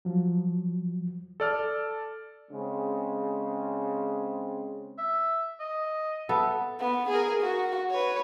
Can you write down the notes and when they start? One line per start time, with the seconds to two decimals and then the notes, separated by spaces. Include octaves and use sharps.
0.05 F3 F#3
1.40 A4 D5 F6
2.50 C#3 G#3 C4
4.98 E5
5.60 D#5
6.29 B3 A4 E5
6.79 B3
7.09 G#4 A#4
7.42 F#4
7.90 B4 C#5